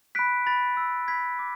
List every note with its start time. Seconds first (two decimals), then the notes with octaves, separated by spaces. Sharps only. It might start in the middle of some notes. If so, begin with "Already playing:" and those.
0.15 B5 F#6 B6 D7
0.46 B5 A6
0.77 E6
1.08 B5 G#6 B6
1.39 D6